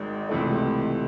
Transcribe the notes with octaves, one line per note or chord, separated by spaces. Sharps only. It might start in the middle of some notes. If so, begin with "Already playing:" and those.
Already playing: G#1 G#2 D#3 G#3
C#2 C3 E3 A3